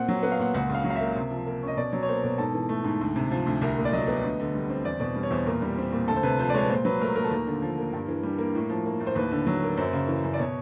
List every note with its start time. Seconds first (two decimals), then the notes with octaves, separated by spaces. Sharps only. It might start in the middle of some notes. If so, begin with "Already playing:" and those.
Already playing: A#2 C4 F#5
0.08 F#3
0.23 B3 F#5
0.32 F5
0.39 A#2 F#5
0.54 C#2 F#5
0.70 C#3 F5
0.84 F#3
0.90 F5
0.96 E5
1.01 A#3
1.16 C3
1.31 F3
1.47 A#3
1.62 C#4
1.67 D#5
1.77 B2 D5
1.93 F#3 C#5
2.03 C#5
2.08 A#3 C5
2.24 B2
2.38 G#2 A4
2.54 E3
2.69 A3
2.84 G#2
3.01 D2
3.16 C3
3.31 F3
3.46 D2
3.61 C2 A#4
3.78 A#2
3.85 D5
3.92 F#3 D#5
4.08 B3
4.24 D2
4.39 D3
4.55 G3
4.70 C4
4.85 E2 D5
5.00 B2 D5
5.16 G3
5.23 C#5
5.31 E2 C5
5.46 A#2 A#4
5.62 G3
5.78 C4
5.93 A#2
6.08 D2 A4
6.16 C5
6.23 C3 B4
6.39 F3 C5
6.50 D5
6.54 G#3 C#5
6.63 B4
6.70 A#2 C5
6.85 F#3 B4
7.00 A3 A#4
7.16 A#2 A#4
7.24 A4
7.31 D#2 A#4
7.47 D3
7.62 F3
7.78 A#3
7.93 G2
8.08 E3
8.23 G3
8.39 A#3
8.55 A2
8.70 F3
8.86 A#3
9.00 A2
9.07 C5
9.15 D#2 B4
9.31 D3
9.47 F#3
9.63 A#3
9.77 F#2 C5
9.93 C#3
10.08 E3
10.24 F#2
10.34 D5
10.39 B2 C#5